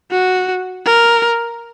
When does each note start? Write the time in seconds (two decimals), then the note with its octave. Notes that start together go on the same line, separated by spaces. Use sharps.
0.11 F#4
0.86 A#4